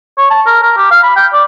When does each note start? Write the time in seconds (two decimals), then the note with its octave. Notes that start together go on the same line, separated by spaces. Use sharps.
0.18 C#5
0.30 A5
0.46 A#4
0.63 A#4
0.77 G4
0.91 F5
1.03 B5
1.16 G5
1.33 D5